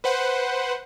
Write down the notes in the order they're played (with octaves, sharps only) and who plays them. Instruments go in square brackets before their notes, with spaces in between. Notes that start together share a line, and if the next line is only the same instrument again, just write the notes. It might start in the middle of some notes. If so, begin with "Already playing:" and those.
[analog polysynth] B4 C5 F#5